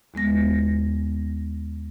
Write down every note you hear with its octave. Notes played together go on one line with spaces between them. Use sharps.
D#2 G#3 B3 A#6